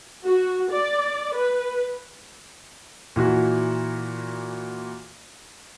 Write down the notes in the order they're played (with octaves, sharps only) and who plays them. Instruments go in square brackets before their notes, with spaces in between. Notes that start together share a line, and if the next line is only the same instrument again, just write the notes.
[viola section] F#4
D5
B4
[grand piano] A#2 E3 F#4